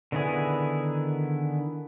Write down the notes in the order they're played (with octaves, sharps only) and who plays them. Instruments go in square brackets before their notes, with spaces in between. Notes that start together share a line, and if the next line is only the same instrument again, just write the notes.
[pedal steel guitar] D3 D#3 B3 E4 G#4